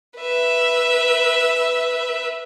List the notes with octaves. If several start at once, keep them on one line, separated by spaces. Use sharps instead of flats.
B4 E5